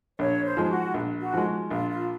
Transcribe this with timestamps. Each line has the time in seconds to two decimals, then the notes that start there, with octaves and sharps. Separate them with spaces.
0.19 A#1 C#5
0.44 C5
0.57 G#2 F3 G#3
0.65 G#4
0.69 F#4
0.94 A#1
1.20 F#4
1.32 G#2 F3 G#3
1.70 A#1 F4
1.89 F4